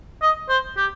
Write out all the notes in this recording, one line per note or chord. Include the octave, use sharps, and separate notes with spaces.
D#5
C5
G4